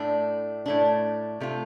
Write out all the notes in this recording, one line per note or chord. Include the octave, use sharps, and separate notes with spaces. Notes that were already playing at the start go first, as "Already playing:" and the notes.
Already playing: A2 A3 D4
A2 A3 D4
C3 A3 F4